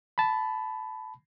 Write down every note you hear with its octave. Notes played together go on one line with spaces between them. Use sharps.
A5 B5